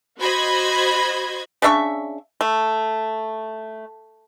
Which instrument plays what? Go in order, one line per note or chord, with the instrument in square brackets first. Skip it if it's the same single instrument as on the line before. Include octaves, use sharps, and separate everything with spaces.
[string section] F#4 C5 D#5 B5 G#6
[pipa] C#3 D4 E5 C#6
A3